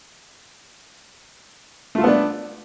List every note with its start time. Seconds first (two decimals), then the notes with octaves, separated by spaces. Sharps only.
1.95 A3
1.98 F4
2.01 A4
2.04 B3
2.07 D4